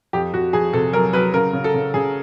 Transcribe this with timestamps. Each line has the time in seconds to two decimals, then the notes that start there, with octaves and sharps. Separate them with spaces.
0.13 F2 G4
0.33 F2 F#4
0.53 F2 G#4
0.73 C3 A4
0.93 F#3 A#4
1.13 F#3 B4
1.34 C#3 A#4
1.53 C#3
1.64 A4
1.74 C#3
1.94 C#3 G#4